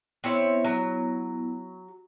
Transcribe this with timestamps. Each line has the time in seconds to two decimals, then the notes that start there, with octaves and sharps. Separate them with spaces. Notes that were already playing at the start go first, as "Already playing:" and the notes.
0.24 B3 C4 E4 C#5 E5
0.64 F#3